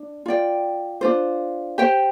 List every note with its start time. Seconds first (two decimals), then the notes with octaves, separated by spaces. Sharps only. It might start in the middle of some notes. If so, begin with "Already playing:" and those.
Already playing: D4
0.26 F4 D5 G5
1.01 D4 F4 C5
1.78 G4 C5 G5